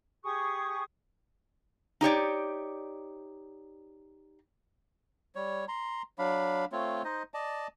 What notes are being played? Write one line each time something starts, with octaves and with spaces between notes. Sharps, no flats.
G4 G#4 C#6 D#6
D#4 G4 C#5 D5
G3 C#5
A#5 C6
F#3 D4 F5 B5
A3 C4 F4 C#5
D#4 C5 D#5
D5 D#5 A5